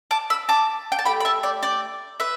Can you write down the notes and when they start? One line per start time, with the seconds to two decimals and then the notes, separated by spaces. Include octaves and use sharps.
0.11 A5 D6
0.30 B5 E6
0.49 A5 D6
0.92 G5
0.99 A5
1.05 A3 G4 G5 B5
1.20 B5
1.25 E5 A5
1.43 D5 G5
1.63 D5 G5
2.20 B4 E5